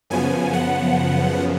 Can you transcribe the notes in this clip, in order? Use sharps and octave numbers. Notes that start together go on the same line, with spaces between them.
F#2 C#3 F3 B3 G#5
F#5